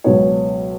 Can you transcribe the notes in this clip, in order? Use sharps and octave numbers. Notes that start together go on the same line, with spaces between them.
C#2 B2 F#3 B3 C#5